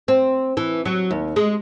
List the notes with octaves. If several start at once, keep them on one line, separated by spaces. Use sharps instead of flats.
C4
E3
F#3
D#2
G#3